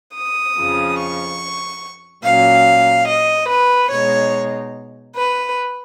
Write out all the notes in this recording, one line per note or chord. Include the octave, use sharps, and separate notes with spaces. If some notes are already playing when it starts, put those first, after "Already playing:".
D#6
F2 C#3 F3
C#6
A#2 F#3 C#4 F5
D#5
B4
B2 G#3 D#4 C#5
B4